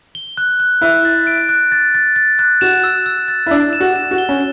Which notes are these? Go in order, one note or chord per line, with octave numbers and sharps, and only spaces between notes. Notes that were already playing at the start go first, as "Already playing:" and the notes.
G7
F#6
F#6
E4 F#6
A6
D7
F#6
A6
A6
A6
F#6
F#4 E7
E6
E6
A6
E4
D4 E6
E7
F#4
E7
F#4
G7
C#4